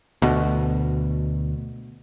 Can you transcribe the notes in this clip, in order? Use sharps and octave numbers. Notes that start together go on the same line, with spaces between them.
D2 B2